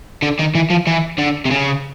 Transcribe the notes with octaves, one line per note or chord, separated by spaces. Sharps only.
D3
D#3
E3
F3
E3
D3
C3
C#3